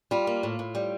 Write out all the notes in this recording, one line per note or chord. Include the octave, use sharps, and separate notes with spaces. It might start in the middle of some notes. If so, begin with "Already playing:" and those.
G3 F4
A#3
A2
A2
G3